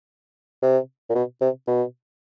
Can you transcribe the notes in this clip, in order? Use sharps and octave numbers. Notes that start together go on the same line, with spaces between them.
C3
A#2
B2
C3
B2